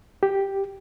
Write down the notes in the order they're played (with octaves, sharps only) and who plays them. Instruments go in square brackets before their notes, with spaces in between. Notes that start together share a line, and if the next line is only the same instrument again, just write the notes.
[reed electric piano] G4